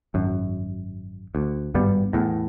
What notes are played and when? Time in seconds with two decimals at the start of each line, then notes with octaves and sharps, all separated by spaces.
0.14 G#1 F#2
1.35 D2
1.74 G#1 G2 G3 B3
2.13 E2 A2